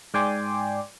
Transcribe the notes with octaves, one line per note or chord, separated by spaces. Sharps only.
G#2 D5 G5 G#5 C6 D6